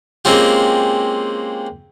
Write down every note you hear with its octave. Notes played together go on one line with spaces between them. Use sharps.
G#3 A#3 C4 C#4 F4 G4